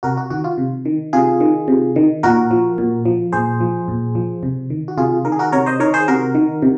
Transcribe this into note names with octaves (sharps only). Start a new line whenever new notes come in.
C3 F#4 A#4
F#4
D#3 F#4
F4
C3
D#3
C3 F4 G#4
D#3
C3
D#3
A#2 F#4 A#4
F3
A#2
F3
A#2 G#4 C5
F3
A#2
F3
C3
D#3
F#4
C3 F4 G#4
D#3 A#4
G#4
F#4 A#4
C3 A#4 C#5
C5 D#5
D#3 A#4 C#5
G#4 C5
C3 F#4 A#4
D#3
C3